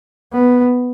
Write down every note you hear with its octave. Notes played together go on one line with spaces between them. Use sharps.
B3